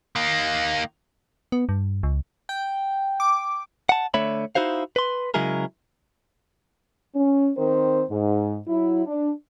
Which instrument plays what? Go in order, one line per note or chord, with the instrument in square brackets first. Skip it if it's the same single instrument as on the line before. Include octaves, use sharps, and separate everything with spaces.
[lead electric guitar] D#3 A#3
[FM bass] B3
G2
C#2
[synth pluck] G5
D6
[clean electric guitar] F#5 A5
D3 A3 C#5 E5 B5
D#4 E4 F#4 C5 F5
B4 C6
C#3 F#3 G#3 E4 G#4 A#4
[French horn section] C#4
D#3 C4 A#4 C5
G#2
F#3 E4
D4